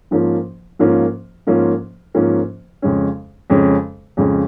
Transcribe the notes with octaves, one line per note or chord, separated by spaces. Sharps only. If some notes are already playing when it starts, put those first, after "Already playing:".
G#2 F3 A#3 C#4 F4
G#2 F3 A#3 C#4 F4
G#2 F3 A#3 C#4 F4
G#2 F3 A#3 C#4 F4
F2 C#3 G#3 C#4
F2 C#3 G#3 C#4
F2 C#3 G#3 C#4